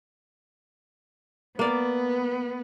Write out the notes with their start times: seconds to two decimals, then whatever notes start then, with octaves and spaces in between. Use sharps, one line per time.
1.59 A#3 B3 D5